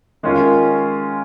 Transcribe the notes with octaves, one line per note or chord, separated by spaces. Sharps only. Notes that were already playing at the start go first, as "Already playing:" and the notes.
D#3 G#3 C#4 F4